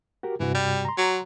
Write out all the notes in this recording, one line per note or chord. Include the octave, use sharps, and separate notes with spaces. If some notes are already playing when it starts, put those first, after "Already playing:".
F#4 G4 A#4
G2 C3 E3 F#4
G3
A#5 C6
F#3